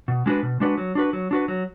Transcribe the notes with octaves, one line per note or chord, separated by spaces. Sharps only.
B2
G#3 D4 F#4 B4
B2
G#3 D4 F#4 B4
F#3
D4 F#4 B4
F#3
D4 F#4 B4
F#3